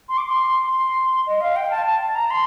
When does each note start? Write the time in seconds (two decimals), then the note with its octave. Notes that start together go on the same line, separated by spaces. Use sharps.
0.09 C6
0.18 D6
0.26 C6
0.68 C6
1.27 D#5
1.41 F5
1.56 G5
1.71 A5
1.86 A5
2.15 A#5
2.31 C6